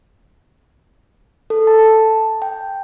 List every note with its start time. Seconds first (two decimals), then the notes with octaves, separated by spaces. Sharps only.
1.50 A4
1.67 A5
2.42 G5